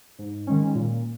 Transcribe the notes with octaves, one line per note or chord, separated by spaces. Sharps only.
G#2
D#3 G#3 C#4
A#2